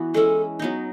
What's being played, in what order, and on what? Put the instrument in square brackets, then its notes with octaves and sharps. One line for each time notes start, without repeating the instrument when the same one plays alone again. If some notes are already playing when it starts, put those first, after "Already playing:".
Already playing: [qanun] E3 B3 F#4
[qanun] G#3 C#4 E4 [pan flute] A4
[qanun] F#3 B3 D#4